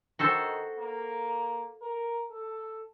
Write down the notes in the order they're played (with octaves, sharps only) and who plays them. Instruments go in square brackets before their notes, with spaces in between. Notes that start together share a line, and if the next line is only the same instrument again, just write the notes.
[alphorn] D#3 [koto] F#4 A4 C5
[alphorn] A#3
A#4
A4